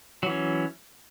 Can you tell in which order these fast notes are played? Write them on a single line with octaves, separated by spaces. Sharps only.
F#3 E3 C#4